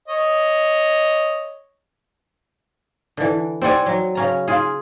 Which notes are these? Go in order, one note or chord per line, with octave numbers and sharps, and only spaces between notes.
C#5 D#5
D3 E3
C4 D5 F#5 G#5
F#3
C#3 C#4 A#5
F4 G#4